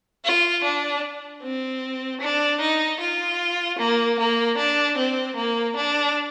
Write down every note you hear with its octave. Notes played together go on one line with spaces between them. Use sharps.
F4
D4
C4
D4
D#4
F4
A#3
A#3
D4
C4
A#3
D4